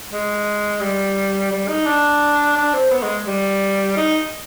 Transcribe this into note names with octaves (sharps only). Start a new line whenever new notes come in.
G#3
G3
G3
D#4
D4
D4
C4
B3
G#3
G3
D#4